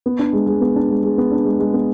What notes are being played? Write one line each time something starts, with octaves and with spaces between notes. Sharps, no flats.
B3
D4
G#3
G#3
B3
D4
G#3
G#3
B3
D4
G#3
G#3
B3